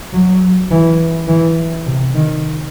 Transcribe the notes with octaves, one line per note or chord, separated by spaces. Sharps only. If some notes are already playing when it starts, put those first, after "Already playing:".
F#3
E3
E3
C3
D#3